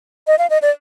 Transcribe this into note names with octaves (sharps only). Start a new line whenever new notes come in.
D#5
F5
D#5
D5